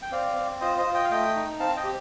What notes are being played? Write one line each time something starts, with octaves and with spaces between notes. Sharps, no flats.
G5
C4 D5 F5
C4
F4 C5 D#5
C5 D#5
F4
D#5 G5
F5
A3 D#5 G5
D#4
C4 F5 A5
D#5 G5
G4